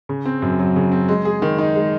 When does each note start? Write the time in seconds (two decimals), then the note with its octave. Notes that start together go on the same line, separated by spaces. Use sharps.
0.09 C#3
0.25 C4
0.42 F#2
0.59 F#3
0.76 C#3
0.92 C4
1.09 G#3
1.25 G#4
1.42 D#3
1.58 D#4
1.75 G#3